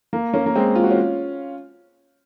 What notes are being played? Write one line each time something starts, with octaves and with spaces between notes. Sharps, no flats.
A#3
A#3 C#4
A#3
G#3 C4
F4
F#4
C#4 F4